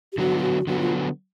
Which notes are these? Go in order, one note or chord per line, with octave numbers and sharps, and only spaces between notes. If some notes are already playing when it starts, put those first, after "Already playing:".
G4
D3 F#3 B3 F#4
F4
F#4
D3 F#3 B3 F#4
F4